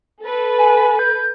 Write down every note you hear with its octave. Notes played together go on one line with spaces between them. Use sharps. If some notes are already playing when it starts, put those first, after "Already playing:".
A4 B4
G#5
G6